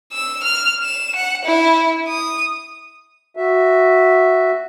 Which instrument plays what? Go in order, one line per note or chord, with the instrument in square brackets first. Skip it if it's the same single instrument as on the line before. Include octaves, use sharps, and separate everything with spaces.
[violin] E6
F6
E7
F#5
E4
D#6
[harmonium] F#4 E5